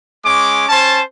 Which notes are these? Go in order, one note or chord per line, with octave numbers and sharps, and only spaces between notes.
G#3 C#4 D6
C#4 C5 A5